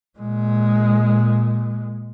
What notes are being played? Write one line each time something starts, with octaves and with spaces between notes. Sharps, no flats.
A#2 G#3